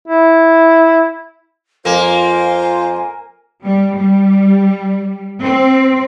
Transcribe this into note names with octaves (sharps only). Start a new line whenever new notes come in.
E4
F2 A#3 F4 C5 G#5
G3
G3
C4